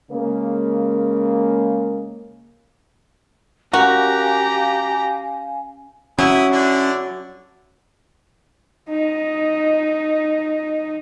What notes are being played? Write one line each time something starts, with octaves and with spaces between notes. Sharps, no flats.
C#3 G#3 A#3
C#4 F#4 G4 A#4 F5 G#5 A#5
F#3 C#4 E4 E5 D#6
D3 D4 E4
D#4 D#5